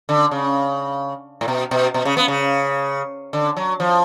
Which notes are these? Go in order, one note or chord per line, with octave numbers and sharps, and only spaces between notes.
D3
C#3
A2
B2
B2
B2
C#3
B3
C#3
D3
F#3
F3